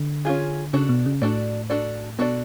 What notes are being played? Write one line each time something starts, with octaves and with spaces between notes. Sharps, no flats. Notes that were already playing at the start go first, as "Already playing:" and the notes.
Already playing: D3
C#4 F4 G#4
C#3 D4 F#4 A4 D5
B2
C#3
A2 D4 F#4 A4 D5
D4 F#4 A4 D5
B2 D4 F#4 A4 D5